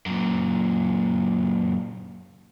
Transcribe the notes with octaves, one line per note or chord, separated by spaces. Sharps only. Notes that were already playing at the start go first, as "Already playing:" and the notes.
F#2 A#2